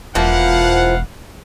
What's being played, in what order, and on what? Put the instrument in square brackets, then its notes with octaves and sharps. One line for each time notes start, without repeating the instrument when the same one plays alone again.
[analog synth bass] E1 [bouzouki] E3 F3 A#3 [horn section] B4 F5 F#5